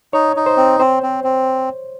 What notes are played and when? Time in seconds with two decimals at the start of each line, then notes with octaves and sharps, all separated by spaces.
0.13 D#4 C#5
0.36 D#4
0.46 C5
0.57 C4
0.80 C4 C5
1.03 C4
1.24 C4